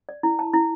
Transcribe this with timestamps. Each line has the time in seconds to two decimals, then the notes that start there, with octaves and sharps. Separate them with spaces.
0.09 D5
0.23 E4
0.39 A5
0.54 E4